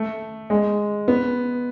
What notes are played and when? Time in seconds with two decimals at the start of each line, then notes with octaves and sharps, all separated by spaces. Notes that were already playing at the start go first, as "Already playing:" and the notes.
Already playing: A3
0.50 G#3
1.08 B3